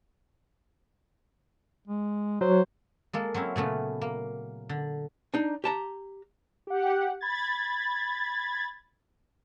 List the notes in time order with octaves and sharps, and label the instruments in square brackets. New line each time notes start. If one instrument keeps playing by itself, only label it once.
[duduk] G#3
[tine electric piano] F#3 [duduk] C5
[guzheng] G#3 A#3 A4
F#3 C4 C#4 E4
A#2 C#3 A3 B3
A#3
D3
[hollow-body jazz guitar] D4 D#4
G4 A5 A#5
[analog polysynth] G4 F#5
B5 G#6 A6